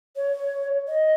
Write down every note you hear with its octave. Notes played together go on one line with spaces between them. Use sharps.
C#5
D#5